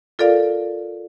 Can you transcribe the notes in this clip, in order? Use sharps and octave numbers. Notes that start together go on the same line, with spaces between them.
F4 A4 A#4 D5 F5